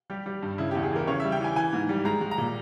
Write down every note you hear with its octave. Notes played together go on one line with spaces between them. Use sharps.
G3 G4
G3
G2
C#3 E4
G4
E2
G#4
E3 A#4
C#3 C#5
E5
G3
G5
E3 G#5
E3 G#5
G#2
G3
G#3 A#5
G#3
A#5
A#2